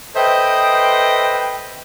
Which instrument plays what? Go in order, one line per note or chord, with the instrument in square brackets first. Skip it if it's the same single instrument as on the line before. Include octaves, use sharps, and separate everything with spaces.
[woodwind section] A4 B4 C5 D#5 E5 G5